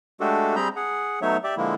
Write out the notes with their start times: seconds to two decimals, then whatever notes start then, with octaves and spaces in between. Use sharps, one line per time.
0.20 G#3 A3 D4 F#4 G4 A4
0.56 G3 C4 G#4 A#5 B5 G6
0.76 G#4 F#5
1.22 F#3 A3 B3 D#4 C#5 E5
1.44 G4 D5 E5
1.57 D3 F3 G#3 A#3 E4